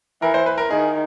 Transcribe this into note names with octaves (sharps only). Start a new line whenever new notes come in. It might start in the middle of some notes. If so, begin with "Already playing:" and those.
E3 A#4
C5
B4
A#4
D#3 G#4